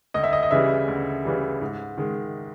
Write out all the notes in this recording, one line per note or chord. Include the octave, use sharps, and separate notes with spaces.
D2 D#5
E5
D#5
D#5
C#3 E3 G3 E5
D2
C#3 E3 G3
G#2
D#3 G#3